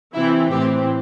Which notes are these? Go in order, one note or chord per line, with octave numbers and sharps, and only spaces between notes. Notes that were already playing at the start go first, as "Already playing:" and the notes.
C3 E3 C4 E4
A2 E3 C4 G4